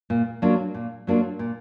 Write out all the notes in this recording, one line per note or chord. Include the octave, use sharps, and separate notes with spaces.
A#2
F#3 A#3 D4 F4
A#2
F#3 A#3 D4 F4
A#2